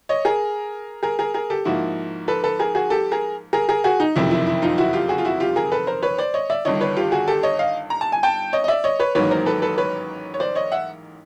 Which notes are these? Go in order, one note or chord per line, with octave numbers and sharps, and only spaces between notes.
C#5 D#5
G#4 A#4
G#4 A#4
G#4 A#4
G#4 A#4
G4 A4
G#2 F3 A#3 E4 F#4
A4 B4
A4 B4
G#4 A#4
F#4 G#4
G4 A4
G#4 A#4
G#4 A#4
G#4 A#4
F#4 G#4
D#4
F#1 F2 C3 D#3 E4
E4
E4
D#4 F4
E4 F#4
F4 G4
F#4 G#4
F4
E4 F#4
F4 G4
G#4 A#4
A4 B4
A#4 C5
B4 C#5
C5 D5
C#5 D#5
D5 E5
G1 G2 D#3 C#5 D#5
B4 C#5
F4 G4
F#4 G#4
G4 A4
C#5 D#5
D#5 F5
A#5
A5
G#5
G5 A5
C#5 D#5
D#5
D5 E5
C#5 D#5
B4 C#5
A1 G#2 D#3 F#3 A#3 B4 C#5
A#4 C5
A4 B4
A4 B4
B4 C#5
C#5
C5 D5
C#5 D#5
E5 F#5